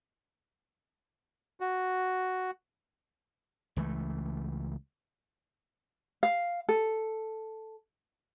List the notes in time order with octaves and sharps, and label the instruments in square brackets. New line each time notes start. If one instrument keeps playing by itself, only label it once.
[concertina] F#4
[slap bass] C#2 E3 G3 A3
[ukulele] F5
A4